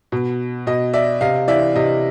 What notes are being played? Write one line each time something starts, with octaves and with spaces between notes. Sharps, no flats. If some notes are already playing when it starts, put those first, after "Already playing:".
B2
B2 D#5
D5 E5
C3 D#5 F5
E3 D5 E5
C3 D#5